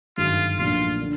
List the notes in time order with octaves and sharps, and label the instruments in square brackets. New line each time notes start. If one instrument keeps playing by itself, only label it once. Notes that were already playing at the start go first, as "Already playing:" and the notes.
[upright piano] G1 F#2 D#3 G#3 C#4 [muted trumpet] F4
[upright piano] B1 A#2 F3 A3 D4 [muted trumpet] F4
[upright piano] D3